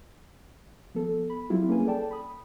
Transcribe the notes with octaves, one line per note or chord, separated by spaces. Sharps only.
F3 B3 A4
B5
F#3 G3 C4 E4 F4 G4
A#3 C#4 G#4 B4 G#5
A4 D5 G5 A5
B5 D#6